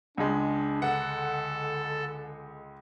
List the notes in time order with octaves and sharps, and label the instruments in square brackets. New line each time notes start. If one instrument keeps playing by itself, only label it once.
[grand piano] C#2 G#3 [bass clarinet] D4
[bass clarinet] D3 [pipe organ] A4 [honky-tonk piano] F#5